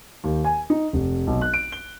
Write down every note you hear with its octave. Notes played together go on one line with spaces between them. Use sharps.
D#2
G#5
D#4
F1
B1
F#6
D7
G7